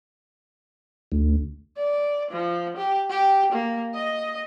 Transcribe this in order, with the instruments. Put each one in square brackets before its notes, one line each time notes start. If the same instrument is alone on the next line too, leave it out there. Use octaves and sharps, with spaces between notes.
[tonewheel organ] D2
[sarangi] D5
F3
G4
G4
A#3
D#5